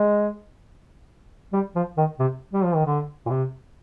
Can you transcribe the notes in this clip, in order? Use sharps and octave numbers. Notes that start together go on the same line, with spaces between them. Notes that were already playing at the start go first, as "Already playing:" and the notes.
Already playing: G#3
G3
F3
D#3
C3
G3
F3
D#3
D3
A#2
C3